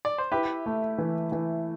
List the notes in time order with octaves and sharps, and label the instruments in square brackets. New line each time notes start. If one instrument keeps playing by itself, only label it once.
[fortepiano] D5
C5
[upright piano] E4 [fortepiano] G4 B4
[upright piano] A3
E3
E3